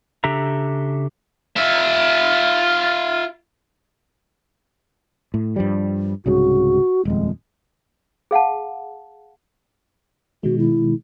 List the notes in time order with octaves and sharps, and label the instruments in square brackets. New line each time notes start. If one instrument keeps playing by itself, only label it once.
[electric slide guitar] C#3 D4 G4 A4 E5 A#5
[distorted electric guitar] F4 E5
[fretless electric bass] A2
G2 F3 G3
[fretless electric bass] C2 G#2 C#3 [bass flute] F#4
[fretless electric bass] D#1 F2 [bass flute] G#3
[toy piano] G#4 F5 F#5 A5
[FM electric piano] B2 D#3 G#3 [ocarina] F#4
[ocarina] E4